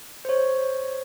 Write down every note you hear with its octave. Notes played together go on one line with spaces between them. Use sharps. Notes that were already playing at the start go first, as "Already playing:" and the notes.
C5 C#5